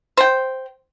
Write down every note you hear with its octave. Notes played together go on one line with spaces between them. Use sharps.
C5 G5